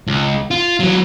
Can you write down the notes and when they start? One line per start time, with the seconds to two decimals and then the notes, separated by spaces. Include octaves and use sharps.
0.07 C#2
0.51 F4
0.80 E3 F#3